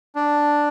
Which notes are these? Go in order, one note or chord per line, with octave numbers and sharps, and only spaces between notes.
D4